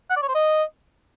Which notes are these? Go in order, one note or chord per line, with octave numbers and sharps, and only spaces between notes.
F#5
D5
C#5
C5
D#5